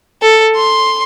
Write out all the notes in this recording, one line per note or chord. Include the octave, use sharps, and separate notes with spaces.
A4
C6